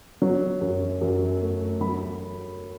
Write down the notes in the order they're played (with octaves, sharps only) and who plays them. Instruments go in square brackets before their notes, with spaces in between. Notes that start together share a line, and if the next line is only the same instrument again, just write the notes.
[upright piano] F#3
F#2
F#2
A3
F#3 B5